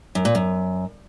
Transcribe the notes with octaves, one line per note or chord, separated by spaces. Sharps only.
F#2
A#2
F#2